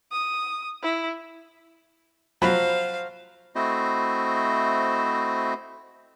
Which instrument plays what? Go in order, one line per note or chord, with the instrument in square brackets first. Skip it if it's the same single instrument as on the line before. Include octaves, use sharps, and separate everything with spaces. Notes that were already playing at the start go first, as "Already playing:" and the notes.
[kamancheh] D#6
E4
[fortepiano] F3 F#3 B5 [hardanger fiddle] C5 F5
[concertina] A3 C4 E4 F#4 C5 D#5